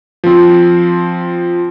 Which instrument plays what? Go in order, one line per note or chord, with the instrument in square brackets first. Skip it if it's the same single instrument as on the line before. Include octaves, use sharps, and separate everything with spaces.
[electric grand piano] F3 C4